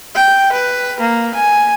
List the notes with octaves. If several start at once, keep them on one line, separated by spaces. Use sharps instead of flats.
G5
B4
A#3
G#5